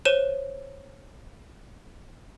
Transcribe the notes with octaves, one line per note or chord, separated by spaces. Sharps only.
C5 C#5 D#7 E7